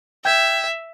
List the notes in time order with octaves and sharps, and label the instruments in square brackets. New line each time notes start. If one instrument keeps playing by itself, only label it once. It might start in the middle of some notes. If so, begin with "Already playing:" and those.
[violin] E5 [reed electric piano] G5 G6 G#6